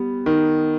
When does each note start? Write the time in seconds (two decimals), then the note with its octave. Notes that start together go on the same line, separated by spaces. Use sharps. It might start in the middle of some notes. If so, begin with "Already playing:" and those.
Already playing: G3 B3
0.26 D#3